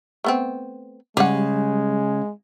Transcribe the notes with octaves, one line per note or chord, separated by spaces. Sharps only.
A3 B3 C4
C#3 G3 G#3 G4 F#5